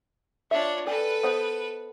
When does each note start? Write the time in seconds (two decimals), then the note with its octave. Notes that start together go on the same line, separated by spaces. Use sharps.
0.51 D4 F4 C#5 E5
0.87 C#4 G4 A4 B4 D5
1.23 B3 C5 D#5